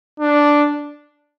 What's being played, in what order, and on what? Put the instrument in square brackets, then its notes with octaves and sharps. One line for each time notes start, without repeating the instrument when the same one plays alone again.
[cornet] D4